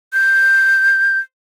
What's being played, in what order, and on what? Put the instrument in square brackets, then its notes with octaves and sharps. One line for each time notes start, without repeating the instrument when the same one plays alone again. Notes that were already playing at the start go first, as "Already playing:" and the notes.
[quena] G6